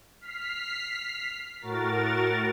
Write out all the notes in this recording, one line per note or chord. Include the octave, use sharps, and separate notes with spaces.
F6 B6 C7
A2 F#4 A#4 A6